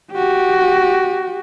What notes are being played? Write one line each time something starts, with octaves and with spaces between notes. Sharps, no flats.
F#4 G4